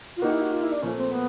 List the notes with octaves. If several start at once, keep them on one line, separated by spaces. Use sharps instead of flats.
F4
A#3 D#4 F#4 G4
E4
F#4
F4
E4
D4
A#2 F3 A3 C#4
C4
B3